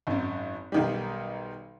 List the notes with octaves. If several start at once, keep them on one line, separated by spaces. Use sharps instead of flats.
G#1 F#2
B1 D#3 G3